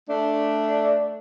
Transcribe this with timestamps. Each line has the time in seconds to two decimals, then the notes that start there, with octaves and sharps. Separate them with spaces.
0.10 A3 D4